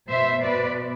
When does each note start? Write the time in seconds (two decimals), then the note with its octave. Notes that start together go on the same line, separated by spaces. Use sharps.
0.09 B2 C5 E5
0.43 B2 B4 D5